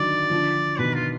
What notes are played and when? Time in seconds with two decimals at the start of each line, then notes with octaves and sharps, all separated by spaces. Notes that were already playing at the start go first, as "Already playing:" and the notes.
Already playing: D3 D#3 F#3 D5
0.30 D3 F3
0.78 B2 D#3 B4
0.95 F4